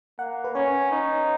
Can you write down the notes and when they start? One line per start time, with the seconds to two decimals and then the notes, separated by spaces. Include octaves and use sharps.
0.19 A#3 F#5
0.44 B4
0.55 C#4 C#5
0.91 D#4